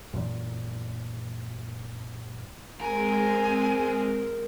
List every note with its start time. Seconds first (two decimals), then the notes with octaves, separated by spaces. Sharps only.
0.14 F#2 A#2 E3
2.81 G#3 C4 A#4 G#5